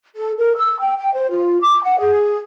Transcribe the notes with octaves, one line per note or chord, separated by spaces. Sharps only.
A4
A#4
E6
G5
G5
C5
F4
D6
F#5
G#4